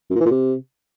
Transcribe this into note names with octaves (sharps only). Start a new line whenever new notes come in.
F#2
A#2
E3
A#2
C3